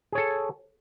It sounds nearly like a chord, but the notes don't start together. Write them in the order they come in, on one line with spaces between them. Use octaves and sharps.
G#4 C#5 A4